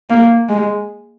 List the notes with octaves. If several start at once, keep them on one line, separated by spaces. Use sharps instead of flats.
A#3
G#3